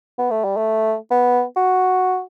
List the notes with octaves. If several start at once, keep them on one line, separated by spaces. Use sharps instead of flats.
B3
A3
G3
A3
B3
F#4